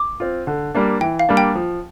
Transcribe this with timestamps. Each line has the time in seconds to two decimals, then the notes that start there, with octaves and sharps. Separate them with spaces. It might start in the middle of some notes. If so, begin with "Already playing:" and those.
Already playing: D6
0.20 C4 F4
0.47 D3
0.74 G3 A#3 D4
1.01 E3 G5
1.19 F5
1.29 G3 A#3 D4
1.37 G5
1.55 F3